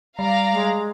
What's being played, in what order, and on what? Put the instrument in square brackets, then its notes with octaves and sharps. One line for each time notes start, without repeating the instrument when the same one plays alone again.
[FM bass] G3 [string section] D5 F5 A#5
[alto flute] G#3